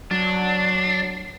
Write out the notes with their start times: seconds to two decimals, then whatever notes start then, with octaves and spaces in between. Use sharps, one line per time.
0.11 F#3 D4